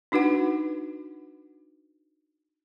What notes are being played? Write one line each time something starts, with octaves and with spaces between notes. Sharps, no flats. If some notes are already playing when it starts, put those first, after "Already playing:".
D4 D#4 F#4 B4 F#5